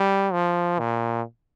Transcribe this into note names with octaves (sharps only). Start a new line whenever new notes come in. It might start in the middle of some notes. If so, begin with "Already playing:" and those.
Already playing: G3
F3
A#2